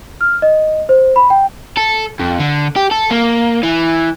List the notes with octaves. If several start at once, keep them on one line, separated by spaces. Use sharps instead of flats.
F6
D#5
C5
B5
G5
A4
F2
D3
G4
A4
A#3
E3